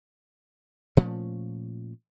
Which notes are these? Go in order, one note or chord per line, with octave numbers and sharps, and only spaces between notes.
A#2 F3 A3 C#4